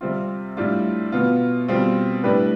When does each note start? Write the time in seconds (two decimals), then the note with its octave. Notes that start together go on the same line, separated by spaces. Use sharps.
0.01 C3 G3 C4 F4
0.57 A2 G3 D4 F4
1.12 B2 B3 F4
1.68 B2 G3 C4 F4
2.24 A2 G3 D4 G4 B4